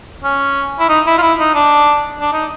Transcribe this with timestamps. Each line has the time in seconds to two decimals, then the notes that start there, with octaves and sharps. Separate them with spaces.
0.24 C#4
0.80 E4
0.89 D#4
1.07 E4
1.18 F4
1.22 E4
1.39 D#4
1.55 D4
2.21 D4
2.33 D#4